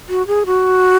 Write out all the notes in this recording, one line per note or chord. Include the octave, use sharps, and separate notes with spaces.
F#4
G#4
F#4